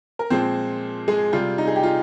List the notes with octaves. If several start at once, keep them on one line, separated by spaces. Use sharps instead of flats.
A#4
A#2 F3 G#3 C4 C5
G#3 G#4
C3 G3 F4
D#4
G#4
G4
F4